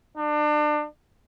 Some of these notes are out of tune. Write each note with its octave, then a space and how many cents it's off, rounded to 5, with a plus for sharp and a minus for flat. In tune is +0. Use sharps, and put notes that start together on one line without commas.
D4 +30